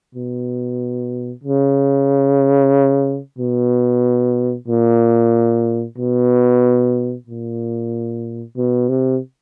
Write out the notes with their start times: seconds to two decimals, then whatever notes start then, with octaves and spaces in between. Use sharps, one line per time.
0.15 B2
1.44 C#3
3.38 B2
4.68 A#2
5.98 B2
7.27 A#2
8.57 B2
8.89 C3